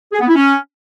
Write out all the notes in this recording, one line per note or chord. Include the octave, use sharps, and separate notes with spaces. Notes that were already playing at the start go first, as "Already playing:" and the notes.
G#4
B3
E4
C#4